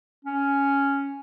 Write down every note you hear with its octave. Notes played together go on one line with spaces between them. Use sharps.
C#4